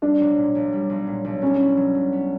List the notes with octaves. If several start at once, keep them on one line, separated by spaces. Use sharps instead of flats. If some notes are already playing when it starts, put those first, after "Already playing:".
G3 D4
B1
A#2
B1
G3
B1
A#2
B1
B3 C#4
E4
F#3
B2
B3